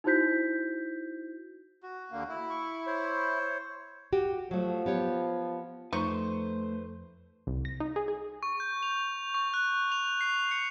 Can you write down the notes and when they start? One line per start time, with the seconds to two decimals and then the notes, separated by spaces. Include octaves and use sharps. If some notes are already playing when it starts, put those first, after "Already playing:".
0.04 D#4 E4 F#4 C5 G6 B6
1.83 F#4
2.12 D#2 D3 A#3
2.29 E4
2.50 C#6
2.86 C5 C#5
4.13 F#4 G4
4.51 F3 F#3 A3
4.86 B3 G4 C#5
5.93 F2 F3 A3 D#4 B4 C5 C#6
7.47 C2
7.65 A#6
7.80 D#4
7.96 G#4
8.08 G#4
8.43 C#6
8.60 G6
8.83 F7
9.34 C#6
9.54 F#6
9.92 F7
10.21 C7
10.51 C#7